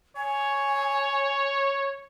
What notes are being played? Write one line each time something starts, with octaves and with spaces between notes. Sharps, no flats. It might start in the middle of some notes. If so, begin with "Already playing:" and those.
C#5 G#5